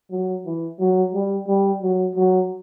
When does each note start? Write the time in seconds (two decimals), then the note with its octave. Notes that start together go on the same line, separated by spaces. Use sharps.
0.11 F#3
0.46 E3
0.79 F#3
1.14 G3
1.47 G3
1.82 F#3
2.16 F#3